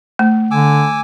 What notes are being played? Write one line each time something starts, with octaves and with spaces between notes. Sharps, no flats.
A3
D3 G#5 D6 E6